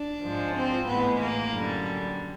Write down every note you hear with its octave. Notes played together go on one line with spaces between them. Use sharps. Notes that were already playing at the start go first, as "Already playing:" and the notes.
Already playing: D4
G#2 F3 G#3
C4
A2 E3 G#3 B3
A#3
F#2 D3 G3